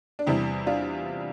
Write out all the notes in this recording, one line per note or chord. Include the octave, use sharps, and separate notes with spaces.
D4
E2 C3 G3 E4
D4 F4